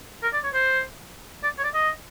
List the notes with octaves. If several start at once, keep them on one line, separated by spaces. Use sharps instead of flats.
A#4
D5
C#5
C5
D5
C#5
D5
D#5